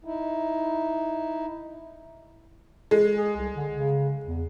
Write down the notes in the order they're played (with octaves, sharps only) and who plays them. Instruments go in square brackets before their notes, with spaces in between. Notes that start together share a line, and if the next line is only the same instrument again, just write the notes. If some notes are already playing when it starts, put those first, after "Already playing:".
[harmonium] D#4 E4
[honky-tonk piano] G#3
[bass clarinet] G#4
C2
D3
C#3
E2